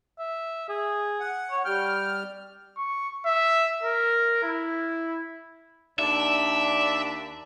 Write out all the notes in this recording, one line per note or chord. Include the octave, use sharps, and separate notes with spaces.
E5
G#4
F#5
C#5
G3 G5 F6
C#6
E5
A#4
E4
D#2 D4 E5